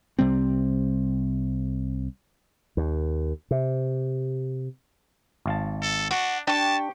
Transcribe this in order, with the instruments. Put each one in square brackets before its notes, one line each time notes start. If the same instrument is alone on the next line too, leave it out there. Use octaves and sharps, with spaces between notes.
[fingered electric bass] C2 C3 G3 C4
[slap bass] D#2
C3
[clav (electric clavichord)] G#1 F5 A5
[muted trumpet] A4
[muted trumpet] D4 [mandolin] F#4
[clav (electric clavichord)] D4 [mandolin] G4 C#6 [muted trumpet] A5